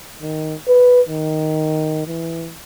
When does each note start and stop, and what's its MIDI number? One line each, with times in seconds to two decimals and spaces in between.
0.21 0.55 51
0.68 1.01 71
1.09 2.06 51
2.07 2.52 52